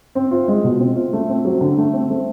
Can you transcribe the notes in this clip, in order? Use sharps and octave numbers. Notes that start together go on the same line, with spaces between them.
C4
F4
G#3
B2
C4
F4
A3
C4
F#3
D3
A3
C4
A3